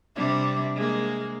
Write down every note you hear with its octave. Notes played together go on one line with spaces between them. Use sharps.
C3 G3 D4
G#3 A#3